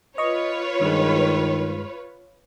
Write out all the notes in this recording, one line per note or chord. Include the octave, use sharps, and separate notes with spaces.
F4 B4 C#5 D#5 C#6
G2 D#3 G#3